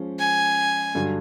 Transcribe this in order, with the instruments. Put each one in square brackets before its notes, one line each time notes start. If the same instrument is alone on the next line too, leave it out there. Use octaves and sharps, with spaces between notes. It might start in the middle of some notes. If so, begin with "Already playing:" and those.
Already playing: [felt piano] F3 G#3 C#4
[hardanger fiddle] G#5
[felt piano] G2 D3 F#3